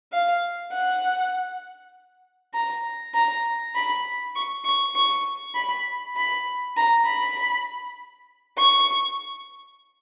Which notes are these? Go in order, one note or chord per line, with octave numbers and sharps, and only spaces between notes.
F5
F#5
A#5
A#5
B5
C#6
C#6
C#6
B5
B5
A#5
B5
C#6